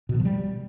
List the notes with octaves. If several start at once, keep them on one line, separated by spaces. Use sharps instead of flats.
B2
D#3
F3
G3